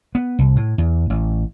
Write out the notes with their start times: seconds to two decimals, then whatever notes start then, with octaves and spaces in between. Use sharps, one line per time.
0.15 B3
0.39 C2
0.56 A2
0.78 E2
1.10 A1